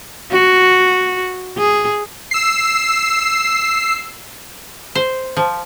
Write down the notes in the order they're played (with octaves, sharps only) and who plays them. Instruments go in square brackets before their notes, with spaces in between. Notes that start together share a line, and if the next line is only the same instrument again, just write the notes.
[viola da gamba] F#4
G#4
[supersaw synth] E6 C7
[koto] C5
F3